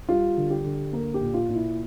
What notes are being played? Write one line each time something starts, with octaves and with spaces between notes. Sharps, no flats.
G3 F4
D3
G4
D3
A#3 A#4
G4
A#2
F4
A#2
E4